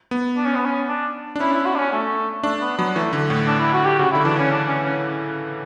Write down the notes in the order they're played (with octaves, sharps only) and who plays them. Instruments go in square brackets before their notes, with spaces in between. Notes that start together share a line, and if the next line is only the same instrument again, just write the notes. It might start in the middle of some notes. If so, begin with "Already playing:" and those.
[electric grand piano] B3
[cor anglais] D4
C#4
B3
C#4
D4
[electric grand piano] D4
[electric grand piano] C#4 [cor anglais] E4
[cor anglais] E4
F#4
D4
C#4
A3
[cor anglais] A3 [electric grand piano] D4
[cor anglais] B3
[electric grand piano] F#3 [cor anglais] B3
[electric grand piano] E3 [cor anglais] A3
[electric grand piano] D3
A2
[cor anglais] D4
E4
F#4
G4
[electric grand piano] C#3 [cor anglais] F#4
[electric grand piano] D3 [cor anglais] E4
[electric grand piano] E3 [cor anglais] D4
[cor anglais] C#4
D4
C#4
C#4